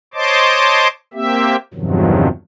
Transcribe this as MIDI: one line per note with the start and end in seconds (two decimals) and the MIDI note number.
0.14 0.88 72
0.14 0.88 73
0.14 0.88 75
0.14 0.88 81
0.14 0.88 84
0.14 0.88 86
1.14 1.56 58
1.14 1.56 60
1.14 1.56 67
1.14 1.56 76
1.74 2.28 40
1.74 2.28 43
1.74 2.28 48
1.74 2.28 51
1.74 2.28 53
1.74 2.28 54